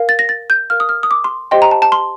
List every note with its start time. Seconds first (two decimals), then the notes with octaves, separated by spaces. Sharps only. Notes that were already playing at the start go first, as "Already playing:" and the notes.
Already playing: A#4 F5
0.09 A6
0.19 A#6
0.29 A6
0.50 G6
0.70 A#4 F5 F6
0.80 D#6
0.89 F6
1.03 D#6
1.11 D6
1.24 C6
1.51 G4 C5 D#5 G5 C6
1.62 A#5
1.71 A5
1.82 A5
1.92 C6